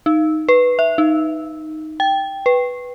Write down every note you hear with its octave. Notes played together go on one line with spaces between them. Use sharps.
D#4
B4
E5
D#4
G5
B4